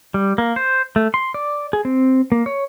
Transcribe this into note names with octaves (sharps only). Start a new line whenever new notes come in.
G3
A#3
C5
A3
C6
D5
G#4
C4
A#3
C#5